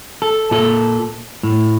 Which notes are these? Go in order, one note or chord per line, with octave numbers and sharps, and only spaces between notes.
A4
A#2 A4
A2